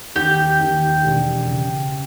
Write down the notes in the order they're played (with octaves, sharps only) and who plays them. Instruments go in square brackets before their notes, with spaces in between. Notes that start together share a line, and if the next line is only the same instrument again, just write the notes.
[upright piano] D#2 [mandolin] G4
[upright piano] D#2
E1
C#3